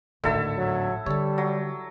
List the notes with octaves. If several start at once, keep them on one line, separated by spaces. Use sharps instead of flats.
G#1 D2 A2 D3 D#3 E4 A4 E5
F#3
D3 G3 A4 C#5
F#3